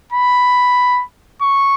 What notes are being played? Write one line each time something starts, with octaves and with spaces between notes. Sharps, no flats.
B5
C#6